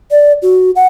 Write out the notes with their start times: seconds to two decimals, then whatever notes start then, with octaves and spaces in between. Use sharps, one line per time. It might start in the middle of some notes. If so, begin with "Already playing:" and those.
0.11 D5
0.42 F#4
0.76 F#5